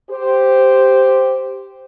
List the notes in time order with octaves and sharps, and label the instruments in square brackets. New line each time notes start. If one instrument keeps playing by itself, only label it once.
[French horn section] G4 C5